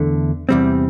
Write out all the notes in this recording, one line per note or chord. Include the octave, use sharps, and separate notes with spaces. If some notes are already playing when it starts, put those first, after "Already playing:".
Already playing: E2 D3 A3
E2 C3 G3 C4